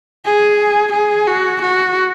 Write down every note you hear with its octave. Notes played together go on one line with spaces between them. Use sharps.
G#4
G#4
F#4
F#4